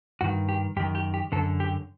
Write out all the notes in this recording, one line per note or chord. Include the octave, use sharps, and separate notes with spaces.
G2 D#3 F#4
G4
F#2 D#3 G4
G4
G4
F#2 D3 A4
G4